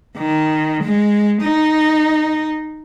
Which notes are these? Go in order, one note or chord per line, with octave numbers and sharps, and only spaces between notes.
D#3
G#3
D#4